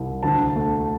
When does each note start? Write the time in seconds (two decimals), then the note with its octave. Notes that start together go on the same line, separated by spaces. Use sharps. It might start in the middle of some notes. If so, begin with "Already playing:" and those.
Already playing: C2
0.23 D2 A5
0.56 A3